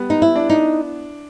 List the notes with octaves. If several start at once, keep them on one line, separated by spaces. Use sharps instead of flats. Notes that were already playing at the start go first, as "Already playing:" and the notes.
Already playing: G3 B3
D#4
E4
D4
D#4